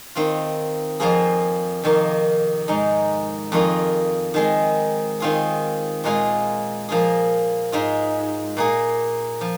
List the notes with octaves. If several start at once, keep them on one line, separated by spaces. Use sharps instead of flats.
D#3 C4 F4
F2 F3 A#3 F4 G#4
F2 C3 D#3 A#3
G#2 G#3 D#4
F2 D#3 A#3 F4 G#4
D#3 G#3 C4 G#4
D#3 C4 F4 G#4
A#2 G#3 F4 G#4
F3 A#3 F4 G#4
G#2 G#3 F4 G#4
A#2 A#3 G#4
F3